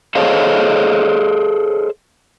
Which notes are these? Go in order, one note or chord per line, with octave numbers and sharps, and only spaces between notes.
G#4 A4 C5 C#5 D#5 F5